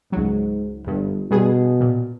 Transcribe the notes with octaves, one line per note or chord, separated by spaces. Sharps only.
C#2 G#2 F#3
G1 G2
G2 B2 G#4
A#2